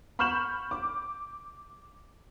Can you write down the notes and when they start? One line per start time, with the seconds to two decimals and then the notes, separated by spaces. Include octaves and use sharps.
0.19 B5 C#6 F6 G6 E7 F#7
0.71 D6